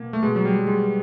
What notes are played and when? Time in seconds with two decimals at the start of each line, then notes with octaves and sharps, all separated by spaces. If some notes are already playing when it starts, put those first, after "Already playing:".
Already playing: B2 A#3
0.13 A3
0.23 B2 G#3
0.35 F#3
0.45 G3
0.57 F#3
0.67 G#3